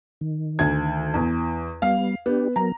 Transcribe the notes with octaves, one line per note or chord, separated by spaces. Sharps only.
D#3
D2 G#6
E2
G3 B3 F5
B3 D4 G4
F#3 B3 A#4 A#5